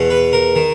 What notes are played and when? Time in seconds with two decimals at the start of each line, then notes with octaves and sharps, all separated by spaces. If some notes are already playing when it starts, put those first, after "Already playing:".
Already playing: E2 B2
0.10 B4
0.33 A#4
0.56 D#3